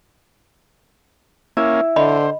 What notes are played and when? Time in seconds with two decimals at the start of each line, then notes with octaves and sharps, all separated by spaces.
1.57 A#3 C#4 E4
1.96 D3 C5 D#5 B5